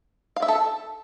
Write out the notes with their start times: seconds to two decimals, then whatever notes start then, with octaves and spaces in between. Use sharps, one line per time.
0.36 F5
0.42 E5
0.48 A4